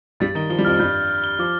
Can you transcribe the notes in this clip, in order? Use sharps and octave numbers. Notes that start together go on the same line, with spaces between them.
G2 G3 A6
D#3 G7
F3 G7
G3
F2 F3 F6
G2 G3 G6
G6
G6
G7
F3 D6